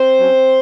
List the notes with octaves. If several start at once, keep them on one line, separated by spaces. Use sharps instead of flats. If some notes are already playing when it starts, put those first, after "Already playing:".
Already playing: C4 C5
F#3 C#4